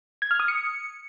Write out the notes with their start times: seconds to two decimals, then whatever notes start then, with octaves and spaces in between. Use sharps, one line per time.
0.22 G#6
0.31 F6
0.40 D#6
0.48 C#7